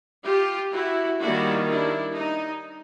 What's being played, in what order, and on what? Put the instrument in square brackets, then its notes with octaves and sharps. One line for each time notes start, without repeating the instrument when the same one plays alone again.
[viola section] F4 G4
E4 F#4
D#3 G3 A#3 D4 E4 F#4
D4 E4
D#4